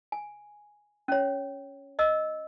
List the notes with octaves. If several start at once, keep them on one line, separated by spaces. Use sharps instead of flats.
G#5
C#4 C#5
D#5 E6